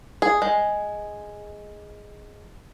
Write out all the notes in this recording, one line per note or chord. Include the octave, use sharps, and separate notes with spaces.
G#4
G#3